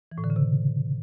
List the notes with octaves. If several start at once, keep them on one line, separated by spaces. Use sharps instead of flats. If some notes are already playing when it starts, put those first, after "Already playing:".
E3
A2
D3
C#3
C3